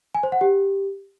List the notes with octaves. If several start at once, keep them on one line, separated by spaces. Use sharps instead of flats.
G#5
C5
F#5
G4